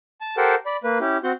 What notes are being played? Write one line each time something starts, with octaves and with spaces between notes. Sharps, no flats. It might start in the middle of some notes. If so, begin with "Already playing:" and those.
A5
G4 A4 A#4 C5 F#5 G5
D5 B5
A#3 B4
C#4 E4 G4
C4 F#4 G6